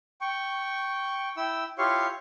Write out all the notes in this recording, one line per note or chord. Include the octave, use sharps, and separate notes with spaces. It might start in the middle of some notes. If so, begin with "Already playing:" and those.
G5 C#6
E4 G5 E6
E4 F4 G4 C#5 F5 C#6